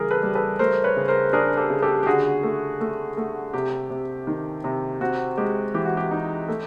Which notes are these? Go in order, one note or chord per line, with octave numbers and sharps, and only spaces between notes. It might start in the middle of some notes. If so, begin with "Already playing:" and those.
Already playing: C#3 E3 G3 G#4 A#4
A4 B4
G3
A4 B4
A3 A#4 C5
B4 C#5
C#3
A#4 C5
D4 G#4 A#4
G4 A4
C#3
G4 A4
G4
D3 F#4 G#4
A3
A3
A3
C3 G4
C3
D#3
C3
C4 F#4
G#3 G4
E3 G4
F#4
G4
D#4
A3